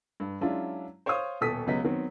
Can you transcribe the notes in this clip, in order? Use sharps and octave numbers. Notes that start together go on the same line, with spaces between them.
G2
F#3 G#3 C#4 D4 E4 F4
C5 C#5 F5 C6 D#6
D#1 B2 A4 D#6 B6
C#2 C#3 F#3 B3 D#5 B6
D#3 F#3 B3 C4